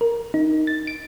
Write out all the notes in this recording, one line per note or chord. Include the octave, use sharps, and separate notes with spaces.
A#4
D#4
A6
D7